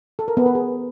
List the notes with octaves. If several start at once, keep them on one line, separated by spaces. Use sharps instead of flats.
A4
A#4
B3
B4
G#4